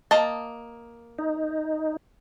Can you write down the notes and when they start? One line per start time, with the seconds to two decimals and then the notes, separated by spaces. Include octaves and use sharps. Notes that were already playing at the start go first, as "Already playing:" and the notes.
0.11 A#3 D#5 A5
1.18 D#4